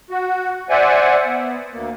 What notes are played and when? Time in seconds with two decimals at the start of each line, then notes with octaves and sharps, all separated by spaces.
0.10 F#4
0.70 C5 D5 E5 F#5 G#5
1.25 B3
1.73 D2 A#3